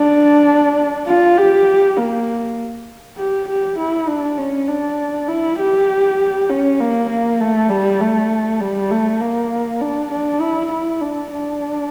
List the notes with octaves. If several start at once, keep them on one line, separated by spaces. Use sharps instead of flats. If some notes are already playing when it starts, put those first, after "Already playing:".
Already playing: D4
F4
G4
A#3
G4
G4
E4
D4
C#4
D4
E4
G4
C#4
A#3
A#3
A3
G3
A3
G3
A3
A#3
D4
D4
E4
E4
D4
D4